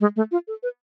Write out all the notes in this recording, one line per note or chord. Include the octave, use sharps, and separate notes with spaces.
G#3
A3
F4
A4
B4